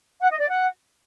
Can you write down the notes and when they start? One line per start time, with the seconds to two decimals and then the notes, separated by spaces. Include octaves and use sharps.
0.20 F#5
0.29 D#5
0.39 D5
0.49 F#5